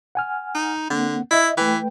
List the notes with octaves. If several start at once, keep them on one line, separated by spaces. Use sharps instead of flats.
F#5 G#5 F6
D#4
D3 A#3 C4 F#5
E4 D#5 E5
E3 A3 B4 G5